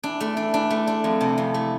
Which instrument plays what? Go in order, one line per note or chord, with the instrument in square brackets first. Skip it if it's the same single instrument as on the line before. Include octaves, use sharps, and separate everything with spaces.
[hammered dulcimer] E3 [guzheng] D4
[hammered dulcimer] D3 [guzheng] A3
[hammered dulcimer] E3 [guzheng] D4
[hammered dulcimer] E3 [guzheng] D4
[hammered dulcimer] D3 [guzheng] A3
[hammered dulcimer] D3 [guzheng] D4
[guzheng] F2 [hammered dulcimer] D3
[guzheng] C3 [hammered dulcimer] E3
[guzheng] F2 [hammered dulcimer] E3
[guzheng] A3